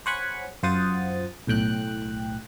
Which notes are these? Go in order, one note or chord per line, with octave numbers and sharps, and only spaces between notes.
C5 C#5 F#5 G#5 B5 C#6
F#2 F4 C5 F#5 D#6 A6
B1 A2 G5 F#6